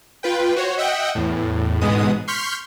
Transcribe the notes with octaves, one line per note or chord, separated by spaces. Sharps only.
F4 B4 G5
F#4 C5 C#5
D#5 E5 F#5 G5
E2 A2
A1 G#2 B2 G#3 B3 D#6
C6 C#6 F6 G6 B6